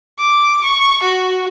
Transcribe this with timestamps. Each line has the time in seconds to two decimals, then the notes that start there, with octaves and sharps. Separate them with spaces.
0.19 D6
0.64 C#6
1.03 F#4